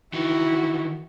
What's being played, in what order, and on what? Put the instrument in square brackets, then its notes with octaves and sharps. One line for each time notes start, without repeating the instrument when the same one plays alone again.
[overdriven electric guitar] D#3 E3 [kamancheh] E4 F#4